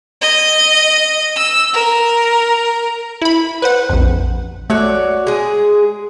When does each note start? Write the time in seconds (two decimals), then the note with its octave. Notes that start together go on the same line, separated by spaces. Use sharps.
0.22 D#5
1.36 E6
1.73 A#4
3.22 E4 B5
3.62 B4 C5 F#5
3.89 A#1 F2
4.70 A3 F#4 C#5 D5
5.27 G#3 G#4